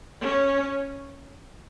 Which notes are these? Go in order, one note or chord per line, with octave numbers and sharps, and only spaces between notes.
C#4